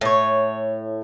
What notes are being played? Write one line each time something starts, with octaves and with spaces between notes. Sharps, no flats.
A2 C#5